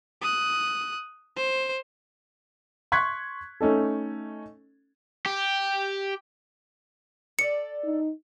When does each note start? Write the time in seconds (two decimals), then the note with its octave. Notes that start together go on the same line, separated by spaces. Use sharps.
0.21 D#6 F#6
1.36 C5
2.92 C6 C#6 F#6 G#6 B6
3.61 A3 C#4 D#4 A4
5.26 G4
7.39 A4 D5 C#7
7.84 D#4